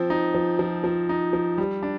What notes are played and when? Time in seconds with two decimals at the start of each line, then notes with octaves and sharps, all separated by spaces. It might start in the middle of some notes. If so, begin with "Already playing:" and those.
Already playing: F3 C4
0.10 D#4
0.34 F3
0.59 F3
0.84 F3
1.09 D#4
1.33 F3
1.58 G3
1.83 D4